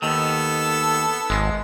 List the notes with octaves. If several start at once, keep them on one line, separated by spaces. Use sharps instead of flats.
D#2 D#3 B3 A4 E6
G#1 G#3